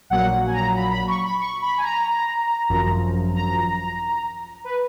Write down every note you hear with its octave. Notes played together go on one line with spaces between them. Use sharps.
A#1 A#2 F#3 A#3 F#5
G#5
A#5
B5
B5
C#6
B5
C#6
B5
G#5
A#5
G#1 F#2 F3
A#5
B4